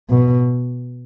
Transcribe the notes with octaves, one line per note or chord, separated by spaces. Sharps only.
B2